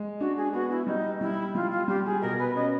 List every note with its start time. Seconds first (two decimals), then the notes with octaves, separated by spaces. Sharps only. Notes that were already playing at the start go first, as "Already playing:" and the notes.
Already playing: G#3
0.20 D4 F#4
0.37 G#4
0.53 B3 F#4
0.70 E4
0.87 G3 D#4
1.21 G3 E4
1.55 G3 F4
1.71 F4
1.88 G3 G4
2.06 G#4
2.21 B2 A#4
2.39 B4
2.55 C#4 D#5